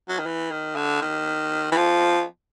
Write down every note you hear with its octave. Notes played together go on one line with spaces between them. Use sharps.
F#3
D#3
E3
D#3
D3
D#3
E3
F3